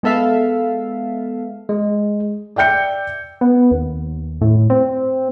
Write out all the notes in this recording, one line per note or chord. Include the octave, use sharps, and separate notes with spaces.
G#3 B3 A4 E5 F5
G#3
D5 E5 G5 G6 C#7
B3
D#2
A2
C4